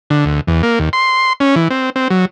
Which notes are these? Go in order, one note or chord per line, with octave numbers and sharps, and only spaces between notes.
D3
D2
E2
A#3
D#2
C6
C#4
E3
C4
C4
F#3